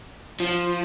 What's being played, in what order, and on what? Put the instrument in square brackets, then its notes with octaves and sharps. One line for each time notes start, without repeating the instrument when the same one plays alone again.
[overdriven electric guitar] F3